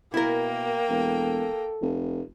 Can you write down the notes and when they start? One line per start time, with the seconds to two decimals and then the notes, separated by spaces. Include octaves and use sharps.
0.14 B2 A#3 E4 A#4 G5
0.89 E1 A4
1.82 F1